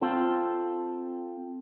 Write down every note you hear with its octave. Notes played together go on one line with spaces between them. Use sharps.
C4 F4 A4 A5